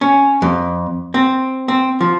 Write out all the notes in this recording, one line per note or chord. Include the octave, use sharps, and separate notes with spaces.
C#4
F2
C4
C4
F3